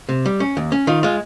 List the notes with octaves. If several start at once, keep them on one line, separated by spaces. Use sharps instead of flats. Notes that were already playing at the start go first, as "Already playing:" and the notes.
C3
G3
C#4
D#2
C#4
D#3 F4
G#3 F4